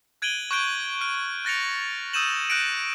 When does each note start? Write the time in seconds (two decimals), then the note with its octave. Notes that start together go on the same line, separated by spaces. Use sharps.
0.22 F#6 G#6 D7 D#7 F#7 G7
0.51 C#6 F#6 G6 D7 G7
1.01 F6 D7
1.45 F#6 A6 A#6 C#7 F7
2.13 D#6 E6 G6 D#7 E7 F#7
2.50 F#6 G6 A#6 C#7 D7